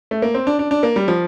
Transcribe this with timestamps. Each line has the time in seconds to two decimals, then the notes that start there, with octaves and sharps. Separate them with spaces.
0.11 A3
0.22 A#3
0.34 C4
0.47 D4
0.59 D4
0.71 D4
0.83 A#3
0.96 G3
1.08 F3